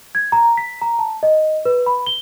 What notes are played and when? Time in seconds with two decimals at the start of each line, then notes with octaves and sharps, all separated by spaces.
0.15 G#6
0.32 A#5
0.57 B6
0.81 A#5
0.99 A5
1.23 D#5
1.66 B4
1.86 B5
2.07 G7